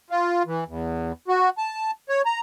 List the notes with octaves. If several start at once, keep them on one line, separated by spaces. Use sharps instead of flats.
F4
E3
E2
F#4
A5
C#5
A#5